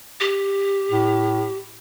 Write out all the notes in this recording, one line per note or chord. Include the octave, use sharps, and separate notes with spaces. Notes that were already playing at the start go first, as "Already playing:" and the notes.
G4
A2